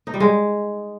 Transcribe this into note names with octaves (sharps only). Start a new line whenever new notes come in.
D#4
G3
G#3